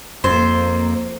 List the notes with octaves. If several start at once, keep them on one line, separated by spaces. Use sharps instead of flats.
F2 A#3 C5